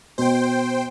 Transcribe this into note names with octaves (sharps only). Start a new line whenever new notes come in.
B2 C5 G5